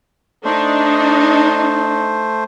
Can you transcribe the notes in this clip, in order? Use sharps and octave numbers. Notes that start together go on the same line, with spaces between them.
A3 D4 D#4 C5